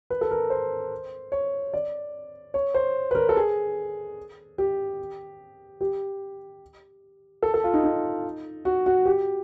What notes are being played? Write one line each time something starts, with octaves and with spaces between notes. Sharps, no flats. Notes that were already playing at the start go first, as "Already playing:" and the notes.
B4
A4
A#4
C5
C#5
D5
C#5
C5
B4
A#4
A4
G#4
G4
G4
A4
A4
F4
D#4
D#4
F#4
F#4
G4